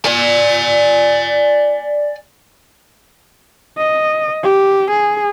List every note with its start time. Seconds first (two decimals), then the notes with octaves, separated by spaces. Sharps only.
0.05 D5 G#5
3.78 D#5
4.44 G4
4.90 G#4